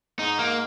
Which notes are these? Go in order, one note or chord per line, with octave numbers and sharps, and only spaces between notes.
G#2 D#4
A#3